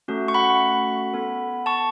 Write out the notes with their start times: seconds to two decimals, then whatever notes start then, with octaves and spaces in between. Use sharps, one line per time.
0.08 A3 C#4 F#4 A4
0.28 C#6
0.34 F#5 B5
1.14 B3 A4
1.66 A5 C#6